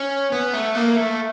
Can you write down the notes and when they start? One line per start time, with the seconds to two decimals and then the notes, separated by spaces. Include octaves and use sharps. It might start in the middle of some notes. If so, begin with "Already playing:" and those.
Already playing: C#4
0.32 B3
0.54 A3
0.75 A#3
0.97 A3